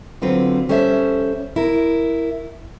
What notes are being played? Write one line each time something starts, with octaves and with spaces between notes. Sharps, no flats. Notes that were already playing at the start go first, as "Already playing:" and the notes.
D3 F#3 C4 F4 B4
G3 C#4 A4 C5 D5 E5
E4 A#4